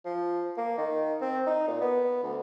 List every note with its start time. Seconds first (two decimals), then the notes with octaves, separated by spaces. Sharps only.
0.05 F3
0.57 A#3
0.78 D#3
1.21 C4
1.46 D#4
1.68 A#2
1.81 B3
2.23 D2